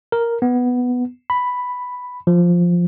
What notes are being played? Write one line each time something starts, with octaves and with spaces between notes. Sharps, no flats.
A#4
B3
B5
F3